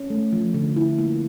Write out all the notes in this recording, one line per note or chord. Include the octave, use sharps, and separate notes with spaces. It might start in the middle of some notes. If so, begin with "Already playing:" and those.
Already playing: C#4
A3
F3
D3
E4
A#3